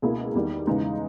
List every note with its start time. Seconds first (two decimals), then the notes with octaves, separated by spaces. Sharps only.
0.02 C#2 B2 A#3 E4 G#4
0.35 E2 D#3 G3
0.67 E2 C#3 E3 G#3 D#4